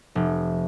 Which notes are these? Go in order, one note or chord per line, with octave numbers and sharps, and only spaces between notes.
F1